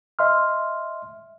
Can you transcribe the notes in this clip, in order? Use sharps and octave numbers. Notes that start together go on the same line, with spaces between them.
D#5 E5 C6 F6